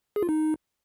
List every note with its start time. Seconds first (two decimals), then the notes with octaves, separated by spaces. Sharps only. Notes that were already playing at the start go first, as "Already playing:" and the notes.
0.16 G#4
0.22 F4
0.29 D#4